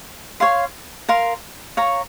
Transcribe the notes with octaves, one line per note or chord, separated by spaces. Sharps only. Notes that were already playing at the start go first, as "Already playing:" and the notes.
C#5 F5 C6
A#4 F5 C6
C#5 F5 A#5 C#6